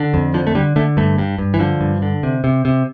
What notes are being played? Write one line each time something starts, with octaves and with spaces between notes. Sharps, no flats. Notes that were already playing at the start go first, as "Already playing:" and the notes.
Already playing: D3
F2
D3 F3
A3
D3 G3
D3 A3
G2 A3
G2
G2
E3
D3 F3
G2
D3
C3
C3
C3